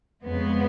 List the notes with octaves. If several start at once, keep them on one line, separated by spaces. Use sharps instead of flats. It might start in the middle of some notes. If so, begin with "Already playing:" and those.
F2 C#3 G#3 B3